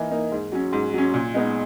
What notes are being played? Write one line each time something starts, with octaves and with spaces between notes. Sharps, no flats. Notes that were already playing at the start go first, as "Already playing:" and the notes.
Already playing: E3 A#3 D#4 A#4
A#3 D#4 A#4
G#2
F#3 C#4
G#2
F#3 C#4
A#2
G#3 B3 D#4